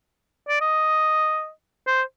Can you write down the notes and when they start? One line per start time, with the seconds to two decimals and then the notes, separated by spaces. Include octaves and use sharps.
0.48 D5
0.61 D#5
1.87 C5